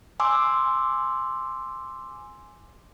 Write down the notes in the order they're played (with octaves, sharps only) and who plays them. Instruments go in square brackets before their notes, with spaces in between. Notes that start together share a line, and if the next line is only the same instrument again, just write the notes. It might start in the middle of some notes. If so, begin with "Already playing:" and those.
[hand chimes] G#5 C6 D6 E6